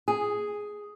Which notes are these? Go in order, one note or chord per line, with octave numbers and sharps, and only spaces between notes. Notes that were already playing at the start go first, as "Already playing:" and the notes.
G#4